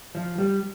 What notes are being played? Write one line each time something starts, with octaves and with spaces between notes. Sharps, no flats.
F3
G3